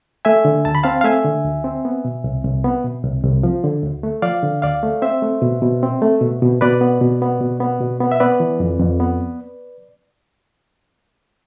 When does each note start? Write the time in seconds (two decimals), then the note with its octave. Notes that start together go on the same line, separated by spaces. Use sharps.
0.25 A3 E5 G#5
0.45 D3
0.65 D2 A5
0.75 B5
0.83 C4 F5 A5
1.01 F5
1.04 A3 E5 G#5
1.24 D3
1.44 D2
1.64 C4
1.85 B3
2.05 B2
2.24 C2
2.45 C2
2.64 B3
2.84 B2
3.04 C2
3.24 C2
3.43 F3
3.64 D3
3.83 D2
4.03 A3
4.22 F3 D5 F5
4.43 D3
4.62 D2 D5 F5
4.83 A3
5.02 C4 C5 E5
5.22 A3
5.42 B2
5.62 B2
5.83 C4
6.02 A3
6.21 B2
6.42 B2
6.61 B2 B4 D5
6.81 B3
7.02 B2
7.22 B3
7.41 B2
7.60 B3
7.81 B2
8.00 B3
8.12 E5
8.20 B3 B4 D5
8.40 E3
8.60 F2
8.80 F2
9.00 B3